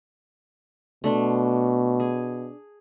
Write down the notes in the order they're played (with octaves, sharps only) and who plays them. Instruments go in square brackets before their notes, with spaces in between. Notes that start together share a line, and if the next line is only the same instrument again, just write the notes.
[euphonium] B2 [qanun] A3 D4 C6
[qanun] G#4